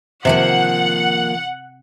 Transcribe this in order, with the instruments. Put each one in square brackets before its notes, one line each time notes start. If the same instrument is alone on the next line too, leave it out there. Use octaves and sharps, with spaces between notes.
[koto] C3 [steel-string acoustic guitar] D#3 F3 A#3 [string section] F#5